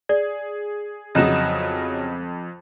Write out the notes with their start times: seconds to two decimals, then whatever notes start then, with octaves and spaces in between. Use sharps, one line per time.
0.09 G#4 D5
1.15 F2 C#3 F#3 B3 D#4 F#6 E7